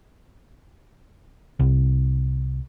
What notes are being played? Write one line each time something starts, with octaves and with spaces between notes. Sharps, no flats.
C2